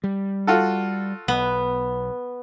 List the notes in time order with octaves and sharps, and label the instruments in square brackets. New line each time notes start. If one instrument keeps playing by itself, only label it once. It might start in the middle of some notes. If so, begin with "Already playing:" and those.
[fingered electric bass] G3
[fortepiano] F4 F#4 A4
[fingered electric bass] B1 [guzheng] B3